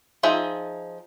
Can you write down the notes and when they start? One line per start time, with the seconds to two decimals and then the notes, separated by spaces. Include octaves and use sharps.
0.23 F3 D#4 G#4 C5 E5